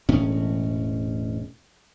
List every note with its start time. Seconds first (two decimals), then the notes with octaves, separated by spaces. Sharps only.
0.09 E1 A2 C#4